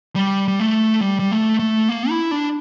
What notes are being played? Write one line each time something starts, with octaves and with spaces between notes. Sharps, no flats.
G3
G3
A3
G3
G3
A3
A3
A#3
E4
D4